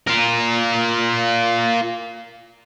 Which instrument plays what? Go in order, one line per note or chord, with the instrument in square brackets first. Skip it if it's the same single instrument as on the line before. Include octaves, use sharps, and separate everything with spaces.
[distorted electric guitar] F4 A#4